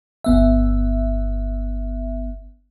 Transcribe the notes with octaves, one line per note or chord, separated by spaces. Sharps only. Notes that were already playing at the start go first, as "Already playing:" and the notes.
G1 B3 E5